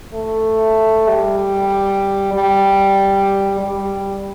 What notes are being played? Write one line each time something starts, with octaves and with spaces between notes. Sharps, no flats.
A3
G3
G3
G3